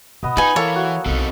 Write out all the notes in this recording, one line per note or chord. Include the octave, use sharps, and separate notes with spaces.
B2 B3 D#5 D#6
D#4 F4 B4 G#5
E3 A#3 A4 C#5
F#4
B1 C4 D#4 E4 A4